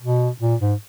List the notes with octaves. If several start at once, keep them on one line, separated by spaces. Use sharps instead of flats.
B2
A#2
G#2